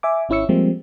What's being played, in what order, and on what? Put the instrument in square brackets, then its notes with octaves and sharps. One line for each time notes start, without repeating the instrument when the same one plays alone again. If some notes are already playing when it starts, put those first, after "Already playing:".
[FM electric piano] E5 G#5 D6
G#1 C#4 E4 C#5 E6 C#7
F3 G3 G#3 A#3 C4